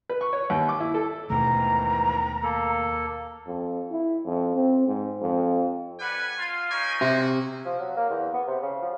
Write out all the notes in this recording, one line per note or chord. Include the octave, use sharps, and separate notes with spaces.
B4
C#6
C#5
D#2
D6
E4
A4
D#2 G#2 B2 D#3 E3 A3 A#5
A#3 A4
F2
E4
F2
C4
G#2
F2
G3 B4 F#5 G#5
F4
A#3 C#4 D#4 G#5
C3 F#4
F3
F#3
A#3
E2
B3
C3
C#3
F3